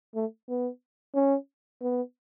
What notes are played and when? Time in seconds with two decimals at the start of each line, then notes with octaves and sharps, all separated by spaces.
0.15 A3
0.49 B3
1.15 C#4
1.81 B3